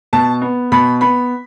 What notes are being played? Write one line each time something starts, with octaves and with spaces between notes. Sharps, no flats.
B2 A5
B3
B2 B5
B3 B5